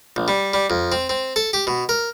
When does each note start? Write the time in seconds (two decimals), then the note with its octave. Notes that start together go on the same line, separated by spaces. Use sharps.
0.16 A#1
0.28 G3
0.54 G3
0.70 F2
0.92 C4
1.09 C4
1.36 A4
1.53 G4
1.67 B2
1.89 A#4